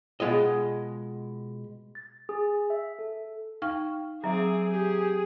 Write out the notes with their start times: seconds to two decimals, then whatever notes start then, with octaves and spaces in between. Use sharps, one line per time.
0.20 B2 G#3 F4 D#5
1.95 A6
2.29 G#4
2.70 E5
2.99 A4
3.62 D#4 F5 G5 C#6 F6
4.24 F#3 C4 G#4 E5 A#5 D6
4.71 G4 G#4